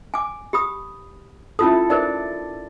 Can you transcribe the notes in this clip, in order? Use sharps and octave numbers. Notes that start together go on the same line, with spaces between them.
G#5 D6
G4 B5 D#6
C#4 E4 F4 A4 D#6
D#4 A#4 C5 D5